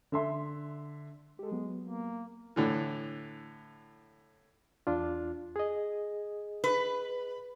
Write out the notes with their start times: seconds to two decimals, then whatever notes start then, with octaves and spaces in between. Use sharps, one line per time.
0.12 D3 E5 C6
1.39 G#3 G4 A4
1.52 F#3 B3
1.84 A#3
2.56 A2 D3 E3
4.87 E2 D4 F4
5.56 G#4 D#5
6.64 B4